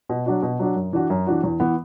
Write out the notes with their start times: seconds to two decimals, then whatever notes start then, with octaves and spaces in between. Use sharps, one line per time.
0.09 B2
0.26 F#3 D4 F#4
0.43 B2
0.59 F#3 D4 F#4
0.76 F#2
0.93 E3 D4 F#4
1.10 F#2
1.27 E3 D4 F#4
1.44 E2
1.60 E3 B3